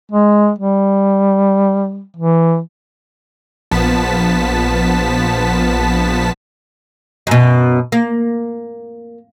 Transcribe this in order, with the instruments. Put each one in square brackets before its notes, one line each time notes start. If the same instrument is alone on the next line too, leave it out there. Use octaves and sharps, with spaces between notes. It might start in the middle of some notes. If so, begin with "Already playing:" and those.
[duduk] G#3
G3
E3
[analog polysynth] A#1 F3 B3 A5 B6
[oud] F#2 B2
A#3